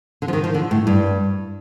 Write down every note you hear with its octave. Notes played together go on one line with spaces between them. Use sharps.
D3
F3
D#3
F3
D3
A2
G2